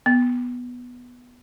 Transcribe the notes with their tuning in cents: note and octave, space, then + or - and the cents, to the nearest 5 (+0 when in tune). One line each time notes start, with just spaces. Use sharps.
B3 -5